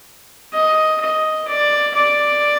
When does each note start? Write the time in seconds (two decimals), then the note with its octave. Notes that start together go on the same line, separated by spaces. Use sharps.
0.54 D#5
1.00 D#5
1.48 D5
1.95 D5